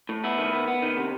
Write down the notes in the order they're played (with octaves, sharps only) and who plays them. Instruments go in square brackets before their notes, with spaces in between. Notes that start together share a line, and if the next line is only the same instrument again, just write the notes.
[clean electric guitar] A2
B3 E4
D#3
B3
B3
D#3
C3